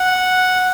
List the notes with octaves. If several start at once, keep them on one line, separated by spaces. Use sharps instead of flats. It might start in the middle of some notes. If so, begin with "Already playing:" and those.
Already playing: F#5